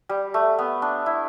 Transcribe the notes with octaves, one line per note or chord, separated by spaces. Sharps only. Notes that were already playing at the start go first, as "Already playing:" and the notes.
G3
A3
B3
D4
E4